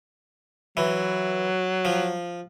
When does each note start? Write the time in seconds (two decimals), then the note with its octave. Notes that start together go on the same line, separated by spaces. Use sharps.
0.77 E3 F#3
1.85 F3